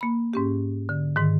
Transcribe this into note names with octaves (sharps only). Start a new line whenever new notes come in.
A#3 B5
G#2 C#4 G4
D3
G#2 D#3